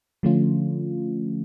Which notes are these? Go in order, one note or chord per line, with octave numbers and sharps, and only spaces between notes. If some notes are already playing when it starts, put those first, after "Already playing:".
D3 F3 A3 C#4 F4